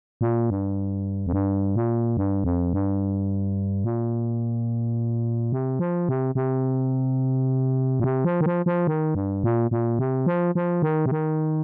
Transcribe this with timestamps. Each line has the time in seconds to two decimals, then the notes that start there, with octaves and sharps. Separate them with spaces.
0.21 A#2
0.50 G2
1.27 F2
1.33 G2
1.76 A#2
2.17 G2
2.44 F2
2.73 G2
3.84 A#2
5.52 C3
5.79 F3
6.09 C3
6.35 C3
8.00 A#2
8.04 C3
8.25 F3
8.41 D#3
8.46 F3
8.66 F3
8.87 D#3
9.15 G2
9.44 A#2
9.71 A#2
9.99 C3
10.26 F3
10.55 F3
10.82 D#3
11.06 C3
11.11 D#3